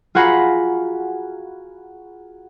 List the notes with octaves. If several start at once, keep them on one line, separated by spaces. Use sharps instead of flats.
F4 F#4 G#4 F#5 A#5 B5